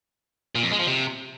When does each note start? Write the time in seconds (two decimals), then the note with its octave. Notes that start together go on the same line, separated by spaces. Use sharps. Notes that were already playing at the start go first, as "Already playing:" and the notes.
0.55 A#2
0.63 F2
0.71 G#3
0.79 F3
0.88 C3